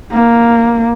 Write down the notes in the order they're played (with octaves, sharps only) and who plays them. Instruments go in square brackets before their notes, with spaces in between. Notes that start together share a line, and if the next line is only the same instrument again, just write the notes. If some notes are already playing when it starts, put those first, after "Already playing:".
[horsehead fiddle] A#3